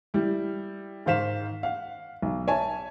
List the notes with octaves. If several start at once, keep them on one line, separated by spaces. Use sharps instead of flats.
G3 E4
G#2 D#3 C5 F5 B6 E7
F5 F#5
B1
C#5 E5 G#5 A5